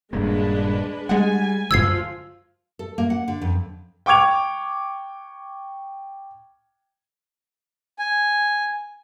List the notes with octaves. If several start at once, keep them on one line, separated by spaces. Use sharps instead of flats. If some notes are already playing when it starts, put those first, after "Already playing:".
D#1 G2 G#3 A#3 D4 B4
G3 G#3 F#5 G#5
F#2 D3 F3 F4 E6 G#6 C7
A4
A#3
F#5
D3
F2
G5 C#6 D6 G#6 F7
G#5